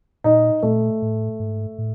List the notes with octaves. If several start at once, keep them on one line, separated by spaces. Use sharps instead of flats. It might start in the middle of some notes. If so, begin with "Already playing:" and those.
A#2 D#4
A#2 A3
A2
G#2
A2